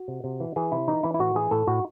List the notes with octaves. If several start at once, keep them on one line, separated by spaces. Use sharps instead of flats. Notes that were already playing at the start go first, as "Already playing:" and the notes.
Already playing: F#4
C3
C3
E3
E3 G#4
C3 E4
E3 D#4
E3 E4
E4
A2 F#4
E3 G#4
A2 A4
A2 F#4